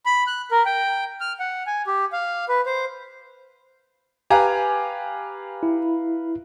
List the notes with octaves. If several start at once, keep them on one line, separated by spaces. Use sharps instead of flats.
B5
F#6
A#4
G5
F6
F#5
G#5
G4
F5
B4
C5
G4 B4 F5 G#5 A#5
E4